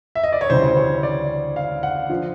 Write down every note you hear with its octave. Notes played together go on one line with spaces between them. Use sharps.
E5
D#5
D5
C#5
D2 C#3 E3 G3 C5
C#5
D5
F5
F#5
D3 F3